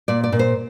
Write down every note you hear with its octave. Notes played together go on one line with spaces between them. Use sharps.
A#2 D5
D5
A#2
C5